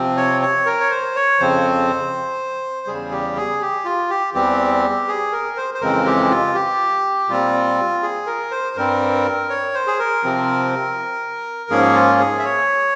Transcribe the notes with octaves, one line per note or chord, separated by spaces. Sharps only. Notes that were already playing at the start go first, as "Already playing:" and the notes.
Already playing: C3 F3 C4
C#5
C#5
A#4
C#5
C5
C#5
F2 C#3 F3 C4 C5
E2 C#3 G3 G#4
G4
G#4
G4
F4
G4
E2 E3 G3 C4 G4
G#4
A#4
C5
C5
F2 C#3 E3 G#3 C4 A#4
G4
F4
G4
A#2 G3 C4 F4
G#4
A#4
C5
G2 G3 C4 A#4
C#5
C5
G#4
A#4
C3 F3 C4
G#2 F3 A#3 C#4 G#4
F4
G#4
E5
C#5